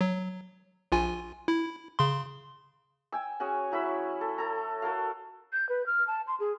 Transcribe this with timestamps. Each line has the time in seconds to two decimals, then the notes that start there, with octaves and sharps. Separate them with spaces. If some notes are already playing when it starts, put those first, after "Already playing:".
0.01 F#3
0.92 A#1 F4 G#5
1.48 E4
1.99 C#3 C6
3.12 G5 G#5 E6
3.40 C#4 F#4 G#4
3.72 F#3 E4 B5 E6
4.21 A4
4.38 A4 A#5
4.82 F#4 A4 A#4 F5
5.53 G6
5.69 B4
5.86 F6
6.07 A5
6.27 C6
6.40 G#4